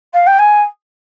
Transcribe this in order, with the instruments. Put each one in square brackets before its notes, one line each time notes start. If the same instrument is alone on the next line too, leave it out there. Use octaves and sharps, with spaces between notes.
[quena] F5
G5
G#5